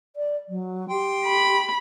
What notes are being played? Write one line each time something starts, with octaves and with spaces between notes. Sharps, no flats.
D5
F#3
G4 G5 C6
B5